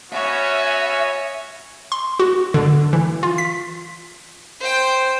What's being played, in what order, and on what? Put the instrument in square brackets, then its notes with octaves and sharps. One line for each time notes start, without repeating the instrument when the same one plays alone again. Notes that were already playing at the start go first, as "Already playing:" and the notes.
[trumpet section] B3 C#4 F#4 [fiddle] C#5 G#5 [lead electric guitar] E5
[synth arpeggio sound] C6
F#4
D3
E3
F4
B6
[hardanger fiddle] C5 G5